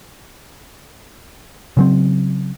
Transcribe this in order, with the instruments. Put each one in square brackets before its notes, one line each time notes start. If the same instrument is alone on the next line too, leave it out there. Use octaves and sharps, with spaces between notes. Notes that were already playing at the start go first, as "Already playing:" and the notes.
[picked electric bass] C#3 F#3 C4